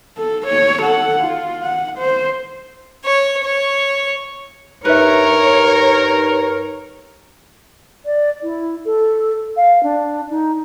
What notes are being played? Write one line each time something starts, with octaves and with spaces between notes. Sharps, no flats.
A4
C#5
A4 F#5
F4
F#5
C5
C#5
C#5
G2 D#4 A#4 B4 C#5 E5
D5
E4
A4
F5
D4
D#4